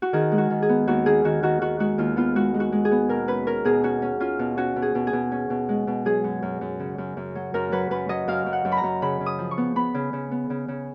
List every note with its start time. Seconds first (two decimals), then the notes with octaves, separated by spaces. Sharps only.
0.02 F#4
0.13 D#3 G#4
0.32 G#3
0.38 F#4
0.50 D#3
0.62 G#4
0.69 B3
0.87 D#2 F#4
1.06 D#3 G#4
1.24 D#3 F#4
1.43 D#3 F#4
1.61 D#3 F#4
1.80 G#3 F#4
1.98 D#2 F4
2.16 B3 F4
2.35 G#3 F#4
2.54 G#3
2.60 F#4
2.72 G#3
2.85 G#4
2.91 B3
3.09 B2 A#4
3.28 C#4 B4
3.47 C#4 A#4
3.65 B2 G#4
3.83 C#4 F#4
4.02 C#4
4.20 C#4 F4
4.39 B2
4.57 C#4 F#4
4.76 B2
4.82 G#4
4.95 B2
5.07 G#4
5.13 B2
5.32 C#4
5.50 B2
5.69 G#3
5.87 B2
6.05 F#3 G#4
6.24 F#2
6.42 F#2
6.61 F#2
6.80 C#3
6.98 F#2
7.17 F#2
7.35 F#3
7.54 F#2 A#4
7.72 F#3 B4
7.91 F#2 B4
8.09 F#3 D#5
8.28 F#2 F5
8.46 F#2
8.53 F#5
8.65 F#2
8.72 B5
8.77 A#5
8.83 F#2
9.02 C#3 B5
9.21 C#3
9.26 D#6
9.39 F3
9.51 C#6
9.57 B3
9.76 B3 B5
9.94 C#3
10.13 C#3
10.31 B3
10.50 C#3
10.68 C#3